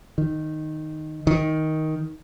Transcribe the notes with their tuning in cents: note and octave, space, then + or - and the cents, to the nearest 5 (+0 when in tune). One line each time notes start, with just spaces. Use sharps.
D#3 -5
D#3 +10